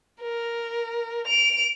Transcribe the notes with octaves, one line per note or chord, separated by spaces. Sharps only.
A#4
D7 F7